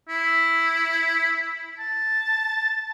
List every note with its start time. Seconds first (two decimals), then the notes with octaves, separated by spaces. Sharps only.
0.09 E4
1.79 A5